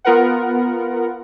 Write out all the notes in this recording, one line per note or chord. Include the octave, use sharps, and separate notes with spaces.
B3 F4 A#4 B4 F#5